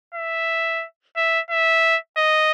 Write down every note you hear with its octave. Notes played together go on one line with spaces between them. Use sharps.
E5
E5
E5
D#5